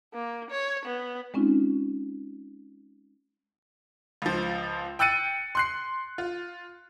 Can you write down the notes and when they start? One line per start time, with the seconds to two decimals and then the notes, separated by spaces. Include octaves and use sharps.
0.14 A#3
0.50 C#5
0.85 B3
1.34 G#3 C4 C#4 D#4 F4
4.22 C#2 F3
4.99 G5 E6 F#6 A6 C#7 D#7
5.55 C6 F#6 C7
6.18 F4